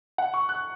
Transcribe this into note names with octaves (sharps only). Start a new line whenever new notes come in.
F#5
C#6
F#6